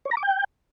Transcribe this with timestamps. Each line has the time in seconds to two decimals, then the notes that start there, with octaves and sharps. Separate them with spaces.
0.05 C#5
0.11 A#5
0.17 D6
0.23 G5